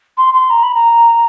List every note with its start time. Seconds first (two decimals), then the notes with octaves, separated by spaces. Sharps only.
0.17 C6
0.33 C6
0.50 A#5
0.63 B5
0.74 A#5